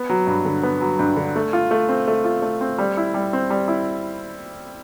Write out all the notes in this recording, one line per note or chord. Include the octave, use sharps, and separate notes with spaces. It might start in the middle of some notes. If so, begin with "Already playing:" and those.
Already playing: B3
F#3
G2
D3
B3
F#3
G2
D3
A3
F4
A3
C4
A3
F4
A3
C4
G3
E4
G3
C4
G3
E4